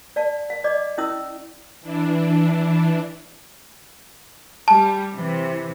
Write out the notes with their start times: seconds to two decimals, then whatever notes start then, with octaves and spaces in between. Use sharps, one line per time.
0.16 D5 F5 A5
0.50 F5
0.64 D5 D#5 D6
0.98 C#4 E4 E5 D#6 E6
1.81 E3 D4
4.68 G3 A5
5.13 C3 E3